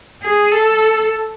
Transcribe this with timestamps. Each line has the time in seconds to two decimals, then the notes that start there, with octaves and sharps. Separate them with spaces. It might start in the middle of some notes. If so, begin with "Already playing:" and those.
0.23 G#4
0.52 A4